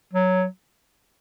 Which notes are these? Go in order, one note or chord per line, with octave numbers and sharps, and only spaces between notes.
F#3